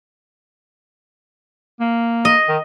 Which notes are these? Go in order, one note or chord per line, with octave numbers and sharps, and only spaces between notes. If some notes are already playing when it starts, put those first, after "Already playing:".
A#3
D#5
D#3